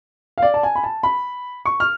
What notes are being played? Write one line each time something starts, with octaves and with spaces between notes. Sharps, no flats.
F5
D5
A5
G#5
B5
A5
B5
C#6
F6